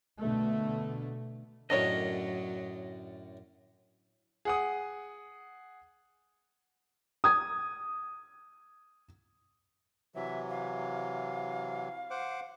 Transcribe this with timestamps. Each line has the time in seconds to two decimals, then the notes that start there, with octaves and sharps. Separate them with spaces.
0.18 B2 D3 A3
1.70 F#2 A2 D3 F#3 D4 A#4 C#5 D#5
4.45 G#4 F#5 D#6
7.24 D#6 G#6
10.15 C3 E3 F#3 E5
10.50 F5
12.10 C5 F#5 D6